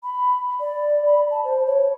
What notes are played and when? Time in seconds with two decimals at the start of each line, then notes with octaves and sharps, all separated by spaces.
0.03 B5
0.60 D5
1.06 B5
1.31 A5
1.44 C5
1.66 C#5